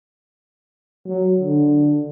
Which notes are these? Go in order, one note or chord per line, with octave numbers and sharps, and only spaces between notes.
F#3
D3